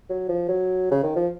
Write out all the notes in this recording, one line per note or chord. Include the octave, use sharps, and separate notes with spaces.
F#3
F3
F#3
C#3
D#3
F3